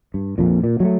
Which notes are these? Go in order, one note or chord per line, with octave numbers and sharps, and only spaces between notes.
G2
A#1 F2 A#2
A#2
F#3 G#3 A3